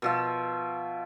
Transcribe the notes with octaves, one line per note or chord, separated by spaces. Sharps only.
B2 F3 E5